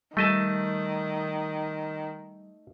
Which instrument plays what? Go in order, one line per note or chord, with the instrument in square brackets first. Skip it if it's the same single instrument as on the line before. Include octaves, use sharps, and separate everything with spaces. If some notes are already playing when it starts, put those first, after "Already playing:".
[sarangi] D#3 [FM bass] G3 [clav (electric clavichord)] A3 D#5 A5